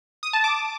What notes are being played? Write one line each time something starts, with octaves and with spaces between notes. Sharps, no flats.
D#6
A5
D6